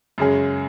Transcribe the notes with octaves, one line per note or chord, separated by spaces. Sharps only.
F#2 C#3 G#3 C#4 G#4